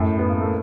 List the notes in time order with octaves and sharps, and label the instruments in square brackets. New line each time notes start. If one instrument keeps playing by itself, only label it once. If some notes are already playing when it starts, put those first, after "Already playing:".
Already playing: [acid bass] F#2 [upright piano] A2 A3
[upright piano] B3
A#3
A3